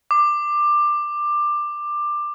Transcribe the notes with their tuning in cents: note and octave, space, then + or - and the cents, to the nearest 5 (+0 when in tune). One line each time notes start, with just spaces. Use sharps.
D6 +15